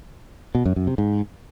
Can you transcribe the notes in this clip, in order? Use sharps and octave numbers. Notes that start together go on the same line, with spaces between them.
B2
F#2
F#2
C3
G#2